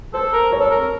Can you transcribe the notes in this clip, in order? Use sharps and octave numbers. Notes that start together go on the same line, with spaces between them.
A4 C5
A#4
C#5
A4
A#4